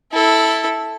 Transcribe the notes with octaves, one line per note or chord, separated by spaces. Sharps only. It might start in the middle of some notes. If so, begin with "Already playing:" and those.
E4 A4